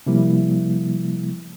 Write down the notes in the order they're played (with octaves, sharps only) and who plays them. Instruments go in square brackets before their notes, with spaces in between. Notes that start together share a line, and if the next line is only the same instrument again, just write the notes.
[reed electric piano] C3 F3 G3 A#3 E4